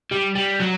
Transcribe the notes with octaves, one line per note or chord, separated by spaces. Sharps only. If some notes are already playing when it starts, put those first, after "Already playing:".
G3
G3
F#3